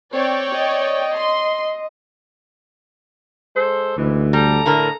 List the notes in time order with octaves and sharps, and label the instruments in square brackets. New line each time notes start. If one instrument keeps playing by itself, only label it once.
[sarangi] C4 [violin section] C#5 D5 G5
[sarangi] D#5
[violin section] C6
[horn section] G#3 A4 C5
[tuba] D2 [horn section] G#2 E3
[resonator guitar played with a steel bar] G3 [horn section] A4 A5 A#5
[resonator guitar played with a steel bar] A2 D3 A#4